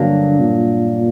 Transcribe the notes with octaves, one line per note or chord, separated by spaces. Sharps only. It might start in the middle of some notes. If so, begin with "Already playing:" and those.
Already playing: G2 D3 F#3 A#3 D4
A#2